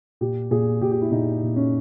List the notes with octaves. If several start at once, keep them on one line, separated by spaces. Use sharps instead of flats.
A#2 G4
A#2 G#4
A#2 G4
G4
E4
A#2 D#4
A#2
C#4